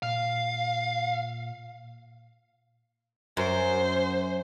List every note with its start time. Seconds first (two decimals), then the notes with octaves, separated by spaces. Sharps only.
0.03 A#2 F5
3.37 F#2 C5